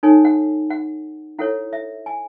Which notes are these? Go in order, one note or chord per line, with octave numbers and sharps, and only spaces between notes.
D#4 A4 C#5 G#5
F#5
F#5
E4 A4 C#5 F#5
E5
G#5